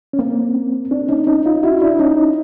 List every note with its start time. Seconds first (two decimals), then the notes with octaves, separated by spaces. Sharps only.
0.13 C#4
0.19 A#3 C4
0.91 C4 D4
1.09 C#4 D#4
1.27 C#4 D#4
1.46 D#4 F4
1.63 E4 F#4
1.81 D4 E4
1.99 C#4 D#4